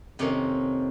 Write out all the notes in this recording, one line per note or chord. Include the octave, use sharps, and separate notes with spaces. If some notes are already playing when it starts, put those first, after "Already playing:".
F2 C3 D#3 A#3 C#4